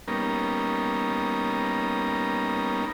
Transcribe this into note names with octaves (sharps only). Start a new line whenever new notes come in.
G3 A#3 B3 C#4 D#4 A#4